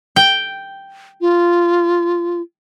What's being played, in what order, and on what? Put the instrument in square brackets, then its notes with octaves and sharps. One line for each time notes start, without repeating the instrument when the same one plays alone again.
[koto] G5
[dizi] F4